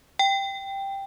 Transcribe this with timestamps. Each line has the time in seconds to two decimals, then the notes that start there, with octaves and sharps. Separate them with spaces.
0.19 G5